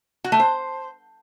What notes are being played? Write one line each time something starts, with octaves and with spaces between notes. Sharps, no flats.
F#4
A3
C5